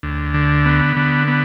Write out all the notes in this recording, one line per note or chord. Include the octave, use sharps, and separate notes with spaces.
D2
D3
B3
D3
B3